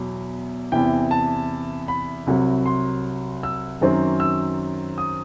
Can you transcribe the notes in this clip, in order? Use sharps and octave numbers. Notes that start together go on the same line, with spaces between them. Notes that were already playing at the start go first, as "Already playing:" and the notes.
Already playing: E2 B2 F#3
E2 C3 E3 G5
A5
B5
C2 C3 F#3
C6
E6
F#2 D#3 F#3 C4
E6
D#6